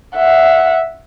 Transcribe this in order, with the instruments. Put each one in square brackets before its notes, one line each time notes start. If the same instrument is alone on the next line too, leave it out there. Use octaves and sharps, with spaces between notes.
[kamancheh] E5 F#5